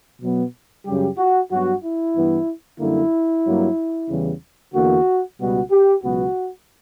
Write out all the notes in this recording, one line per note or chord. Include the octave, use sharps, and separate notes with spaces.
B2 F#3 B3
F#2 C#3 G3 G4
F#4
G2 F#3 B3 F#4
E4
G2 E3 B3
F#2 D3 G3 A#3 E4
G2 F#3 A#3
E2 C#3 E3 G3
E2 D3 A#3 F#4
C#2 B2 G3 B3 F#4
G4
C#2 B2 F#3 B3 F#4